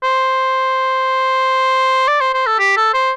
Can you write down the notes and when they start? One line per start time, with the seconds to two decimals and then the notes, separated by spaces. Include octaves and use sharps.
0.04 C5
2.08 D5
2.21 C5
2.34 C5
2.47 A4
2.59 G4
2.77 A4
2.94 C5